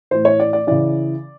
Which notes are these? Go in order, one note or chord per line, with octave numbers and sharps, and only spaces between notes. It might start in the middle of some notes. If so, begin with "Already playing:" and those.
A2 E3 C5
C#5
D5
D5
C#3 E3 D5